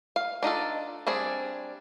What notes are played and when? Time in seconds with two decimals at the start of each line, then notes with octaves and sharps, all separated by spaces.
0.16 F5
0.43 D4 D#4 F4 A4
1.07 G3 C4 D4 G#4